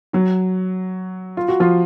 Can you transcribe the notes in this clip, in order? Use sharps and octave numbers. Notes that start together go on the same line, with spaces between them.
F#3 F#4
F4
F#4
F3 F4